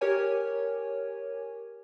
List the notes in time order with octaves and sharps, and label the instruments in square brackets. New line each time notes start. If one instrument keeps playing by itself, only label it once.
[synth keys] G4 A#4 C#5 G#5